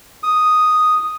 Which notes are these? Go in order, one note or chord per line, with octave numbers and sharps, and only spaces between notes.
D#6